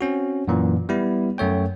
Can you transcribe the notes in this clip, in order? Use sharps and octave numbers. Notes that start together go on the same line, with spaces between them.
C4 C#4 F#4
F#2 A#2 E3
G3 B3 E4
F#2 A3 C#5 G5